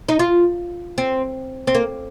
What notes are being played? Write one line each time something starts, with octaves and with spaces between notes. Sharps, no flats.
D#4
F4
C4
C4
A#3